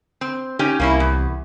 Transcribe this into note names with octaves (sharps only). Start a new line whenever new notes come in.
C4
C#4 D#4 G4
C2 A#3 C#4 E4
E2